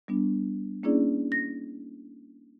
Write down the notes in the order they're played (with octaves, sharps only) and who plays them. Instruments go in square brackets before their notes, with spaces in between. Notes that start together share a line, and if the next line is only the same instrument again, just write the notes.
[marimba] G3 B3 D4
A#3 C#4 D4 E4 G#4 D5
A#6